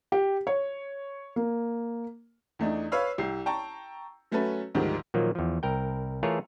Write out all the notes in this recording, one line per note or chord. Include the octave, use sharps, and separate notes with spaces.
G4
C#5
A#3
E2 A3 D4 D#4
B4 C#5 F5 E6
C2 G4 C7
G5 A5 A#5 C#6
F#3 A3 C#4 F#4 A4 B4
D2 G#2 D#3 F3 G3
A#2 D#3 F3 F#3 A#3
E2 F3
C2 A#4 G5
E3 A3 F4 G#4 A#4 C#5